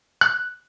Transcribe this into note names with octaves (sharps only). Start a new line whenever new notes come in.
F#6